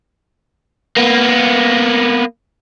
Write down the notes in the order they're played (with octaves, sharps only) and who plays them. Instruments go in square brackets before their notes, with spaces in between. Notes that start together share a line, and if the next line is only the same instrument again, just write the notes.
[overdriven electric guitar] A#3 B3